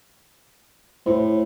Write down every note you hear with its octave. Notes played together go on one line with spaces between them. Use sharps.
A2 C5